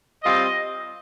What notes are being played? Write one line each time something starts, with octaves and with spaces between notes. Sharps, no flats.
G3 C4 F4 D#5